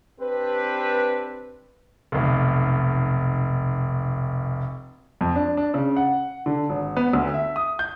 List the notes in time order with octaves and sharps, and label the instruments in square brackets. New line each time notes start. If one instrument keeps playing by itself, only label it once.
[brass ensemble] C4 D4 G4 B4
[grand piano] F1 B1
F2
D4
D4
C#3
F#5
D3
G#1
B3
D2
E5
D#6
G6